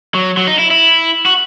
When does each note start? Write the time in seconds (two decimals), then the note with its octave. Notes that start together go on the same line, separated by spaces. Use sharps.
0.14 F#3
0.37 F#3
0.47 D#4
0.59 E4
0.71 E4
1.26 F#4